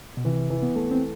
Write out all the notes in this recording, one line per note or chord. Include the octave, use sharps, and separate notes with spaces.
B2
C3 E3
E3
B3
A3
C4